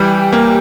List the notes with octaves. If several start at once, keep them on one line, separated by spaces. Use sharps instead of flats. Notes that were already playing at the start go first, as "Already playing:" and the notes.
Already playing: E3 G3 G4 G5
A#3